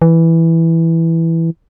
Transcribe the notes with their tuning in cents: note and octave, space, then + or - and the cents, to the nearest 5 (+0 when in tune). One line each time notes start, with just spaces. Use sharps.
E3 +0